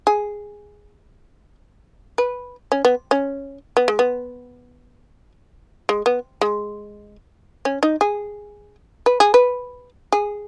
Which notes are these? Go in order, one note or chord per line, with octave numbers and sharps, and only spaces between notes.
G#4
B4
C#4
B3
C#4
B3
G#3
B3
G#3
B3
G#3
C#4
D#4
G#4
B4
G#4
B4
G#4